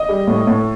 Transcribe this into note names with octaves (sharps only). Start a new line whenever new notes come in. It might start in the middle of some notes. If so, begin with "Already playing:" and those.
Already playing: D#5
G3
A2
A2